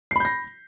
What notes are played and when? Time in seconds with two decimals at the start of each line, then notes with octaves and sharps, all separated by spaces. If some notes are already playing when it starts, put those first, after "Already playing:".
0.11 C7
0.16 B5
0.20 G6
0.25 A#6